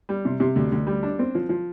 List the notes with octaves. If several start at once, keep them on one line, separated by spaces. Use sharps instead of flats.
G3
C3
C3
D2
D2
G3
D4
C4
F3
F3